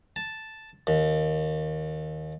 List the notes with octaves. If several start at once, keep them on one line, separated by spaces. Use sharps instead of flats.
A5
D#2